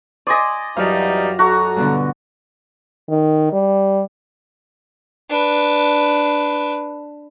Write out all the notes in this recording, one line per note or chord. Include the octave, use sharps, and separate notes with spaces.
D5 D#5 G#5 C6 D#6
F#2 E3 G3 D#4 F4 F5 A5
F#4 A4 A#5
G2 B2 D3
D#3
G3
D4 B4